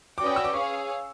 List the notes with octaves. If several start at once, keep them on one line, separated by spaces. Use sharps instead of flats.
C#4 F#4 B4 D5 G5 D6
D#6
E6
D6
G#4 C#5 F5 C#6